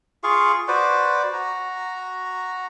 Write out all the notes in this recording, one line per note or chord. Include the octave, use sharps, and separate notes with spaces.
F4 G#4 F5 C#6
F#4 B4 C5 D5
F#4 A#5